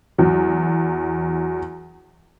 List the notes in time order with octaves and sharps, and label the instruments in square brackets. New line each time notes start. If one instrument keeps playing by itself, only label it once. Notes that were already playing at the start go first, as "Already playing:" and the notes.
[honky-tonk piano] E2 F#3